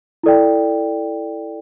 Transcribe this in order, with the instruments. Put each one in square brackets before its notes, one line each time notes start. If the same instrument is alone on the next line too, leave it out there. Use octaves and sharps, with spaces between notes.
[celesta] E4 A4 D5 G5